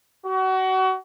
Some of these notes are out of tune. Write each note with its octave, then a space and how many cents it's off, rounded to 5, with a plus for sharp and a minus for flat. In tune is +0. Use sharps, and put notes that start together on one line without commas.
F#4 +30